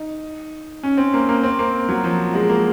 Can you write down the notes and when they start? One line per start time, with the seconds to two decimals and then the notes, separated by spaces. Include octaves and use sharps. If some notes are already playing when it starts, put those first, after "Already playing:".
Already playing: D#4
0.83 C#4
0.97 C4
1.14 A#3
1.29 A#3
1.43 C4
1.59 A#3
1.89 F#3
2.04 F3
2.34 G#3
2.49 A#3